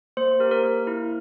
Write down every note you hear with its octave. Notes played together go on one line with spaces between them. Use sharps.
A#3 C5
C5
G4 A#4
A#4
A#3
E4